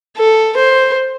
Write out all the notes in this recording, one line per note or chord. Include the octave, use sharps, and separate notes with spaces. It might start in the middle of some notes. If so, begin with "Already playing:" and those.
A4
C5